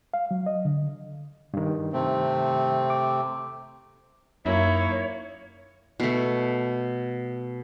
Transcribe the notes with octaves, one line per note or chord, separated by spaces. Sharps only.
F5
F#3
D#5
D3
G2 D#3
C3 A3 C4
D6
F#2 A#3 D#4 E4 C#5
B2 A3